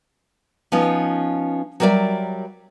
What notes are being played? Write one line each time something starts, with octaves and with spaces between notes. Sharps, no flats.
F3 B3 C#4 D#4
F#3 G3 A#4 C#5 D5 E5